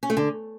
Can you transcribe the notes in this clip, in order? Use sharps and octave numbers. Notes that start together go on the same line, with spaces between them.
C#4
A3
D3